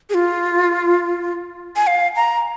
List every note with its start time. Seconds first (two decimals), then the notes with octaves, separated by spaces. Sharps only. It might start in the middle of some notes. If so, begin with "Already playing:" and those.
0.10 G#4
0.14 F4
1.76 G#5
1.87 F5
2.16 A#5